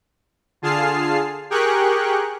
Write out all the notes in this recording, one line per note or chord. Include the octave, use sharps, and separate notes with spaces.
D3 F4 G#4 A5 F6 C7
G4 G#4 A#4 G5 C#6 F#6